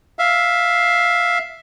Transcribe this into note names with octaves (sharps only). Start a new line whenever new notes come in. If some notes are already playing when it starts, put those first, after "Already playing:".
E5 F5